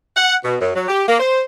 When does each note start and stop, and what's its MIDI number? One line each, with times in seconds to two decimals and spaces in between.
0.16 0.34 78
0.43 0.55 47
0.59 0.70 42
0.75 0.86 54
0.88 1.04 67
1.07 1.18 58
1.19 1.41 72